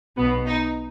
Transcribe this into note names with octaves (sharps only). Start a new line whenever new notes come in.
B1 B2 B3
D#4